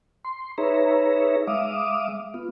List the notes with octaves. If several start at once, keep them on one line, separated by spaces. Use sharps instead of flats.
C6
D#4 G#4 B4 C#5 E5 A#5
G#3 E5 F5 D6 D#6
B3 F4